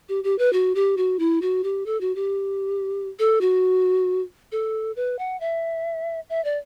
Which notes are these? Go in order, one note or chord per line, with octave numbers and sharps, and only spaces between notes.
G4
G4
B4
F#4
G4
F#4
E4
F#4
G4
A4
F#4
G4
A4
F#4
A4
B4
F#5
E5
E5
D5